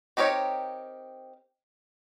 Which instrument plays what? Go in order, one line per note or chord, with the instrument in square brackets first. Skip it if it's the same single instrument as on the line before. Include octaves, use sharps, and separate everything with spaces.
[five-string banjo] C4 D#4 G4 A#4 C#5